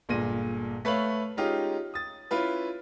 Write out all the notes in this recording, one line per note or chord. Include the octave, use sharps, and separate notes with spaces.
G1 A#2 G#3 A#6 D#7
A3 B4 C#5 F5 F#7
G#3 C#4 D#4 F4 G4
D#6 A6
C#4 E4 F4 B4